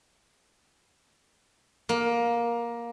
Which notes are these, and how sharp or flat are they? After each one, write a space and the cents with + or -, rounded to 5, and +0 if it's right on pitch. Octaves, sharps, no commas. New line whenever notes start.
A#3 +15